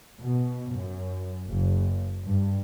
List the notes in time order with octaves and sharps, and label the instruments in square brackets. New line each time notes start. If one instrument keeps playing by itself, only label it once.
[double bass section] B2
F#2
F#1
G2